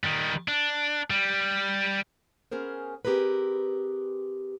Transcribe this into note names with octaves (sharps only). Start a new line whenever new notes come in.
D#3 G3
D4
G3
B3 C#4 G#4 A#4 C5
C4 G4 G#4 A#4 B4